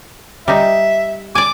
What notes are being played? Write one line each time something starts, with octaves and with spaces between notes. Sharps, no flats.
G3 D#4 E5
D5 G#5 D6